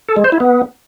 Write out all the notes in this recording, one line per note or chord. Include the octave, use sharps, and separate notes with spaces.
A4
G#3
C5
E4
B3